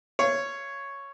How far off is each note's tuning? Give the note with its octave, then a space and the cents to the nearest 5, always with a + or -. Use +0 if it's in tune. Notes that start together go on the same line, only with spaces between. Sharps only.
C#5 +0 F5 -30 C#6 +0